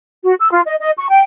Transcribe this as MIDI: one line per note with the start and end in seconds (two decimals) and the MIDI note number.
0.23 0.33 66
0.39 0.49 88
0.52 0.61 65
0.65 0.75 75
0.80 0.91 75
0.98 1.06 85
1.09 1.21 79